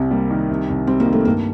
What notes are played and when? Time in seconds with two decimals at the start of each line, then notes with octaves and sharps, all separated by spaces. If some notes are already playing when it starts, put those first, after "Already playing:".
Already playing: C2 C3 C4
0.11 G3 A#3
0.30 D#3
0.50 C3
0.69 C2
0.87 G3 C4
1.00 A#3
1.06 D#3
1.12 A3
1.25 G2 A#3